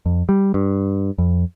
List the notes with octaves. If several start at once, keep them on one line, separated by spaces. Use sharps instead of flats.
F2
G3
G2
F2